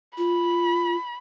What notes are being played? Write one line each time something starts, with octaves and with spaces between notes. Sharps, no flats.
F4 B5